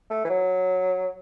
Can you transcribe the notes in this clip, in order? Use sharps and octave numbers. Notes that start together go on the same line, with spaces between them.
A3
E3
F#3